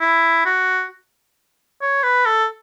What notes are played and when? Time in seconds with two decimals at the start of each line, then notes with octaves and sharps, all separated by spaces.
0.01 E4
0.45 F#4
1.82 C#5
2.03 B4
2.26 A4